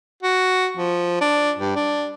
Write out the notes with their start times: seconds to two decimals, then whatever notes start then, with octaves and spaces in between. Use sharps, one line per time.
0.23 F#4
0.77 F3
1.21 D4
1.59 G2
1.76 D4